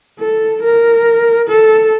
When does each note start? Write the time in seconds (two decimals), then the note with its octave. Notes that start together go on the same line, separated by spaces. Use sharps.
0.20 A4
0.63 A#4
1.49 A4